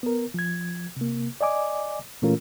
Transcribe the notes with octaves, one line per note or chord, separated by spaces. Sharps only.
B3 A#4
F3 G#6
C3 A#3
D5 D#5 G#5 D6
A#2 E3 A3 C#4 F4 A#4